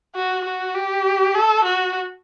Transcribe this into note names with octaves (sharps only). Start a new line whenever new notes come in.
F#4
F#4
G4
A4
F#4